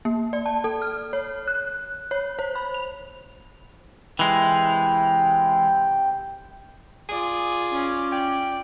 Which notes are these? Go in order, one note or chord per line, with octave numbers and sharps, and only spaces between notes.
A#3
D5
A5
A4
F6
C#5
F#6
C#5
C5
B5
F7
C3 E3 G#3 G5
F4 G#4 D5
C#4
D5 G5